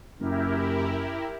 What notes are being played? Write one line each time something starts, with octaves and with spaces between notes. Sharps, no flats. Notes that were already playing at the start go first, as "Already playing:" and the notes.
F#1 F#2 E4 G4 A#4